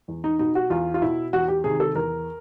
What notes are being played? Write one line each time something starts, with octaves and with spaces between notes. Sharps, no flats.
E2
D#4
B2 D#4
F#4
E2 F4
F4
B2 E4
E2 F#4
G4
C3 D#3 G#4
A4
E2 A#4